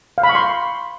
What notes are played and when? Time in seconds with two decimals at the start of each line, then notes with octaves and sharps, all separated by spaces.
0.18 F5
0.23 B5
0.29 C#6
0.35 C6